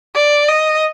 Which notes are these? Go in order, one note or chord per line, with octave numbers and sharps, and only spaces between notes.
D5
D#5